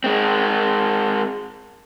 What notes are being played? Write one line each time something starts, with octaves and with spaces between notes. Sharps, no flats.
G#3 C4